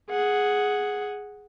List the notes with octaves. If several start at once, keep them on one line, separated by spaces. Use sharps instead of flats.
G#4 F#5